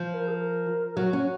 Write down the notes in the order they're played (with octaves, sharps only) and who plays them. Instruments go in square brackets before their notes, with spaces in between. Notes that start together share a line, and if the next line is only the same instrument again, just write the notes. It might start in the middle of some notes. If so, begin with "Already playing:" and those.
Already playing: [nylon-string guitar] F3
[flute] C5
A#4
G#4
A#4
[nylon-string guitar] F#3 [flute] F#4
[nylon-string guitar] C#4